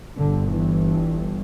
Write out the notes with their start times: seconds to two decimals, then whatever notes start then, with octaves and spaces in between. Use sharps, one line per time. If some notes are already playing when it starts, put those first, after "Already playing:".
0.16 G1 G2 D3
0.51 E3